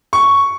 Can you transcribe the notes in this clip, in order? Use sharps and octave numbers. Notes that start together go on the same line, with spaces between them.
C#6